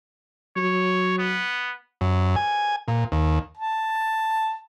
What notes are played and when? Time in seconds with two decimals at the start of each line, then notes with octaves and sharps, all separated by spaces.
0.56 F#3 C#5
1.18 B3
2.01 F#2
2.36 G#5
2.88 A#2
3.12 D#2
3.57 A5